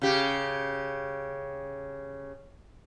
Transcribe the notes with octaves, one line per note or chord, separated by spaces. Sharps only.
C#3 G4